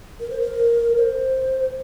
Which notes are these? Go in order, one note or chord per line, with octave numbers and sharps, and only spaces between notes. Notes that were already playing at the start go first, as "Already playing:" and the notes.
A#4
C5
A#4
C5